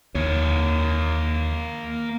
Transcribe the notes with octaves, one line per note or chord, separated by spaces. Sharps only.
D#2 A#3 C#5